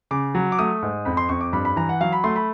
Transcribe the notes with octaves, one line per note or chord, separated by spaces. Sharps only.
C#3 D6
F#3
D6
A3 D#6
G#2
F2 B5
C6
F2 C#6
D6
G2 B5
B5
E3 A#5
F#5
F#3 F5
B5
A3 C6
B5